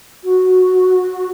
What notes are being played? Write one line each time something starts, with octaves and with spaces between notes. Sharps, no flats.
F#4